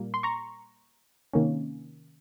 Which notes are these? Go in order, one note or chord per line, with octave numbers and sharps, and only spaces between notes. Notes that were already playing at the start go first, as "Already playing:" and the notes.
Already playing: A#2 G3 A#3
C6
A#5 C#6
C3 D#3 A#3 C#4